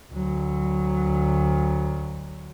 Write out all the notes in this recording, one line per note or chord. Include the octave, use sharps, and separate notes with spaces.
D2 F#3